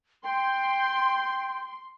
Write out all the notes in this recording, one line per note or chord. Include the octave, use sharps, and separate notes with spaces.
G5 C6